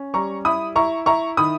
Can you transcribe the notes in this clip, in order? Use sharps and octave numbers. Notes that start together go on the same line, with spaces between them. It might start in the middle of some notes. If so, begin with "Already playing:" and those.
Already playing: C#4
G3 A#5 C#6
E4 B5 D#6
E4 A#5 C#6
E4 A#5 C#6
D#3 B5 D#6